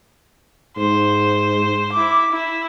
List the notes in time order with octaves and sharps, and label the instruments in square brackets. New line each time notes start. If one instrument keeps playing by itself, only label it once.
[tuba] G#2 [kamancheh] C5
[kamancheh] E4 D6
E4